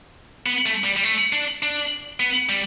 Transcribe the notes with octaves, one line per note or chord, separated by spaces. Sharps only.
B3
A3
G3
G3
A3
D4
D4
B3
G3